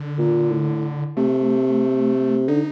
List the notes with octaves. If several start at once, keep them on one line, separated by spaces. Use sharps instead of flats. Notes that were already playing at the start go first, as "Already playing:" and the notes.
Already playing: D3
A#2
A2
C3 A3
D3 D#4